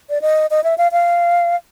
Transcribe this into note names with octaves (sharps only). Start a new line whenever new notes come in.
D5
D#5
D#5
E5
F5
F5